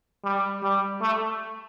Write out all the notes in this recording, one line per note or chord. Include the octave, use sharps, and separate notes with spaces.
G3
G3
A3